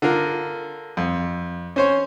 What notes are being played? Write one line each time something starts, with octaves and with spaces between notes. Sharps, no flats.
D3 F4 A#4
F2
C#4 C5 C#5